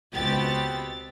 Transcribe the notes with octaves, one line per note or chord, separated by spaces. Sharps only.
C#2 B2 B3 C4 G4 A6